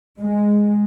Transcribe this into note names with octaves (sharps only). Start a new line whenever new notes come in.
G#3